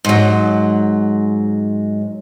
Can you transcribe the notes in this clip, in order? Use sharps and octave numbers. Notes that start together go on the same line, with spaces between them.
G#2 F#3